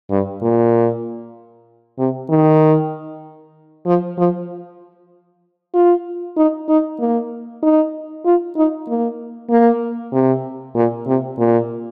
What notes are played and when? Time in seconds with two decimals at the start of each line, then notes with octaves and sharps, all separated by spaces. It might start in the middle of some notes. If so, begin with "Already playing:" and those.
0.10 G2
0.42 A#2
1.99 C3
2.30 D#3
3.86 F3
4.18 F3
5.74 F4
6.37 D#4
6.69 D#4
7.00 A#3
7.62 D#4
8.25 F4
8.56 D#4
8.88 A#3
9.50 A#3
10.12 C3
10.75 A#2
11.07 C3
11.38 A#2